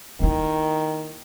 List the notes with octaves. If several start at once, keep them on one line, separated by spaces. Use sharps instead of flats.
D#3 A#3 E4